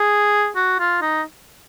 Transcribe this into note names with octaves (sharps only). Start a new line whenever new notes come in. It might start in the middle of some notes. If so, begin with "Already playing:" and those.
Already playing: G#4
F#4
F4
D#4